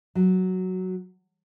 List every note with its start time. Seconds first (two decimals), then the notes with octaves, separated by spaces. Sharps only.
0.15 F#3